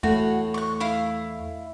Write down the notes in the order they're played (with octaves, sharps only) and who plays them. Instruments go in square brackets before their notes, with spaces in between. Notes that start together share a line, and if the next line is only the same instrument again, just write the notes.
[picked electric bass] E2 A3 [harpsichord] A2 [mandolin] F#4
[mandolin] C#6 F#6
E4 F5